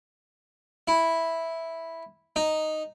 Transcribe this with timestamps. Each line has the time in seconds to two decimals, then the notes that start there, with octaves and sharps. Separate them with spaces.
0.88 E4
2.36 D#4